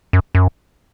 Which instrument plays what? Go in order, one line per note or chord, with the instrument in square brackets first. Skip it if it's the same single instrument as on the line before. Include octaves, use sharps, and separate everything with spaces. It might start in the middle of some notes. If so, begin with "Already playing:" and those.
[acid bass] F#2
F#2